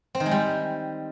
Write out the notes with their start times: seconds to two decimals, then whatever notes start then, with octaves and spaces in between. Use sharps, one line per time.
0.15 C4
0.20 D#3
0.26 G#3
0.31 G3